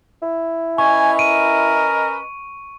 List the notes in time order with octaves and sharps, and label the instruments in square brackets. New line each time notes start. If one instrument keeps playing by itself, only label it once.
[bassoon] E4
[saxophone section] C#4 B4 D#5 [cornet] G#5 [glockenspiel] C#6
[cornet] A#4 [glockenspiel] D7 D#7